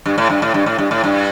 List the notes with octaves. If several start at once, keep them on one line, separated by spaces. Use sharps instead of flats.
G2
A2
G2
A2
G2
A2
G2
A2
G2